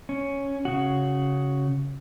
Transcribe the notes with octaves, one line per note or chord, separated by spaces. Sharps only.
C#4
C#3 F#4